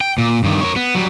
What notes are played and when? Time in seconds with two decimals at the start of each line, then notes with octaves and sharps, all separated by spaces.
0.01 G5
0.18 A#2
0.44 G2 D#3
0.61 A#4 C#5
0.76 B3
0.95 F#3 G3